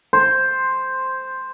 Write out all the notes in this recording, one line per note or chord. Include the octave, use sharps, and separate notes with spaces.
C5